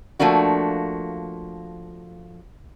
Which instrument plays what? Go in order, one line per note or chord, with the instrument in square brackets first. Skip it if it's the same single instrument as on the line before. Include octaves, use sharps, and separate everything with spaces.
[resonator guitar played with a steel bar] F3 A3 A#3 D4 F#4